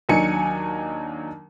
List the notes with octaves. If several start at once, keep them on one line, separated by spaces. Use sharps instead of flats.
D#2 F#3 D4 D#4 G#5 C#7